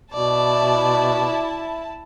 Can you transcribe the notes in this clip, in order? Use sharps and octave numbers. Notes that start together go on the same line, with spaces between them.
B2 E4 D5 A5